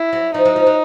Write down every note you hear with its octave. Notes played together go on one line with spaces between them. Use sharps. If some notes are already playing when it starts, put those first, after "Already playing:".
Already playing: E4
F#3
F3 D#4
F#3
F3
F#3